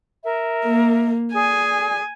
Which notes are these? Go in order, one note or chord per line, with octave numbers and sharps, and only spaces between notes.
A#4 E5
A#3
G#4 D5 G#5